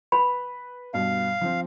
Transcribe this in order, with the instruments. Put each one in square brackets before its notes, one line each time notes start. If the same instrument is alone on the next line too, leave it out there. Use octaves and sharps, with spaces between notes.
[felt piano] B4 [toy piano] B5
[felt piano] G2 B2 [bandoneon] F5
[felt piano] F3 C4